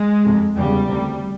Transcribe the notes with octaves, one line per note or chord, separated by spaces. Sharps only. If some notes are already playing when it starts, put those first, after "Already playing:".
Already playing: G#3
F2 C3
E2 C#3 G3
D2 C3